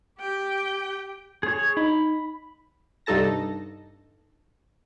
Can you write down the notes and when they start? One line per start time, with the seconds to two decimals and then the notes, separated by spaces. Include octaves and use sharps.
0.19 G4 G5
1.43 G#4 C#5
1.77 D#4 B5
3.06 C2 G2 D#4 A4 A5 A#6